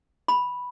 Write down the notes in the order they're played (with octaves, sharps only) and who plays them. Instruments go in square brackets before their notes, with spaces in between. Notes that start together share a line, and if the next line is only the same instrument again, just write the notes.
[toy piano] B5